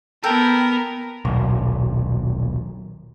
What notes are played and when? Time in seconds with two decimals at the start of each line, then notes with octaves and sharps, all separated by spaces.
0.24 B3 A4 A#4 G5
1.25 D#1 B1